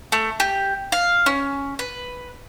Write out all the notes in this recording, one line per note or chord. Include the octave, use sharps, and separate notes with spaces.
A3
G4
F5
C#4
B4